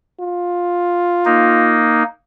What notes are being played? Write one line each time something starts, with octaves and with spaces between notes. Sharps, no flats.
F4
A#3 D#4